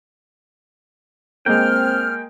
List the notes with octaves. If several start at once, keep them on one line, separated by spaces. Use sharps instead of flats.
G#3 A#3 C4 G5 F6